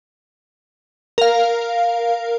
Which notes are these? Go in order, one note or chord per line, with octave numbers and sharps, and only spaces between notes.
A#4 F5